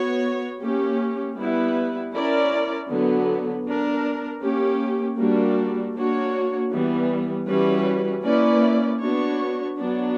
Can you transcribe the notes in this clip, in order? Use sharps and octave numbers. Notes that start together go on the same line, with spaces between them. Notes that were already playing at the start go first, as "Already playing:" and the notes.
Already playing: B3 F#4 C#5
A#3 C#4 G4
G3 B3 E4 B4
C#4 E4 A#4 D5
D3 F#3 B3
B3 D4 A#4
A#3 C#4 G4
G3 A#3 D4 F#4
A#3 D4 F#4 C#5
E3 G3 B3
E3 G3 C#4 F#4 B4
A#3 C#4 E4 B4 D5
B3 D4 F#4 C#5
F#3 B3 D4